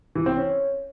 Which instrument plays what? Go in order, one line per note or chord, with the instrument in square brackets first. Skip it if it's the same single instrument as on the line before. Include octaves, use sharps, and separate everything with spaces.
[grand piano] E3
C4
C#4